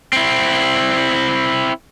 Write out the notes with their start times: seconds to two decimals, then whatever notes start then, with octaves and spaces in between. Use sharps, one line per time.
0.13 C4 E4